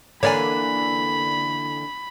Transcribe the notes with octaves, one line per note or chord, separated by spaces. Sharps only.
D3 E3 A#3 C#5 D5 G#5 B5